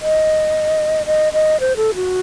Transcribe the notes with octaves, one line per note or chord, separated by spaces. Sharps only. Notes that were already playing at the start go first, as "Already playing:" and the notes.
D#5
D#5
D#5
C5
A4
F#4